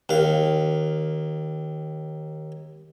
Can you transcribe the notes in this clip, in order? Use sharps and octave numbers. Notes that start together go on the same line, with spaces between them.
D#2 F5